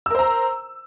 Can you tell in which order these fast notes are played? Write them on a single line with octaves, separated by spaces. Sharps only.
E6 A#4 C5 A#5